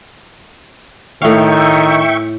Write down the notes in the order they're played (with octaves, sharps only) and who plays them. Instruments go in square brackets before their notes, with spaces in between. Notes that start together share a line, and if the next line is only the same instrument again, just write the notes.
[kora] A2 F5 [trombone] D#3 [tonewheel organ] E5 G5 C#6